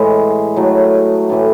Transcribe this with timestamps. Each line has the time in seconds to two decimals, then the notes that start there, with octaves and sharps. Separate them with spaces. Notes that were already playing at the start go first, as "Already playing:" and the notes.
Already playing: A2 E3 G#3
0.56 A2 F#3 A3
1.29 A2 E3 A3